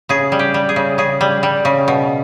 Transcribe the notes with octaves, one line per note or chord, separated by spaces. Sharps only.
C#3 G#4
G3
G4
G3
G#4
C#3
C#3 G#4
G3
G3
C#3
B2